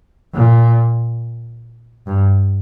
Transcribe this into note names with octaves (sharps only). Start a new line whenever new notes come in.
A#2
G2